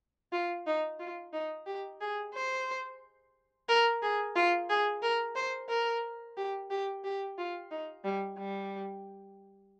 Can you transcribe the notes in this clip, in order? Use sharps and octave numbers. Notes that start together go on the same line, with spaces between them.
F4
D#4
F4
D#4
G4
G#4
C5
A#4
G#4
F4
G#4
A#4
C5
A#4
G4
G4
G4
F4
D#4
G3
G3